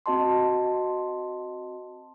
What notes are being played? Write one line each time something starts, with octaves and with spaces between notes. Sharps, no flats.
C4 F#4 D#5 A5 C6